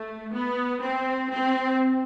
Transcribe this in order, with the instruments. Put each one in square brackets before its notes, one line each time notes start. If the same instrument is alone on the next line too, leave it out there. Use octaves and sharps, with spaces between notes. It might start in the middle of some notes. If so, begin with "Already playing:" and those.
Already playing: [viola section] A3
B3
C4
C4